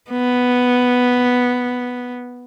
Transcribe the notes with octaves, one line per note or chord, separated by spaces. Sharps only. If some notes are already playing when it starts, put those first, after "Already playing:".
B3